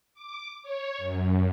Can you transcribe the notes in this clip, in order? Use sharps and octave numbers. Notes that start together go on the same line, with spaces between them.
D6
C#5
F#2